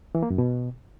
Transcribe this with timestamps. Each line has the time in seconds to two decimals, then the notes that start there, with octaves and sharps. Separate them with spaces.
0.15 E3
0.23 A#3
0.30 F#2
0.38 B2